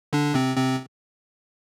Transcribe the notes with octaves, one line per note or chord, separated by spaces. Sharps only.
D3 D4
C3 C4
C3 C4